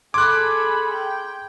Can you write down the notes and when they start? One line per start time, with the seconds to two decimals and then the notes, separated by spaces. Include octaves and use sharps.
0.14 G#4 A4 B5 C6 D6 F#6 G#6
0.92 G5